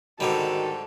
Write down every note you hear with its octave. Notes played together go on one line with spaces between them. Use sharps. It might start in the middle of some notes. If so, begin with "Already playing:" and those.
G#2 D3 D#3 G3 F#4 A4